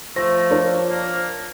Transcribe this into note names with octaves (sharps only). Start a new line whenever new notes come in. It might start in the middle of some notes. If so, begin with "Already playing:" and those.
F3 A3 C5 A#6
D4 A#4 C#5
A#3